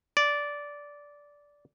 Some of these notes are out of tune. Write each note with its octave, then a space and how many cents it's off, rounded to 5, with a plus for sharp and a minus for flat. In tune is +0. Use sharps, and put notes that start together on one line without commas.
D5 -10